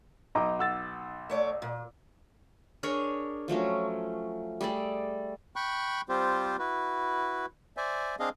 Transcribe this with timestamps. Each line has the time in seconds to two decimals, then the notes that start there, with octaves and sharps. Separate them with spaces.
0.35 B1 D#4 D#5 A#5 D6
0.59 F#5 E6 A6
1.30 A3 C#5 D5
1.62 A#2
2.83 D4 G#4 A#4 C#5
3.48 F3 F#3 A3 C#4
4.61 G3 A3 G#4 D5
5.56 G5 B5 C#6 F#6
6.09 G3 C4 F4 G4 C5
6.59 E4 F#4 B4
7.77 C5 D5 E5 G#5
8.20 C4 D4 G#4 D#5 F5